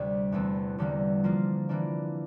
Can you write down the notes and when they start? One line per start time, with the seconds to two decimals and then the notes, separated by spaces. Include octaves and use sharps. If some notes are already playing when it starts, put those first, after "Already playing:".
Already playing: D2 C3 G3
0.32 E2 E3 A3 C4
0.78 E2 D3 G3 A#3
1.24 F3 A#3 F4
1.69 E3 A#3 D4